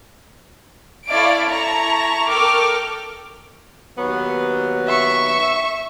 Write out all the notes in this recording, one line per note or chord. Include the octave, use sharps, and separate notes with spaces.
E4 A4 C#5 D5 F5 D7
E4 A5 A#5 C#6
A4 A#4 G5 C#6 D6 F6
D#2 F#3 B3
E5 C#6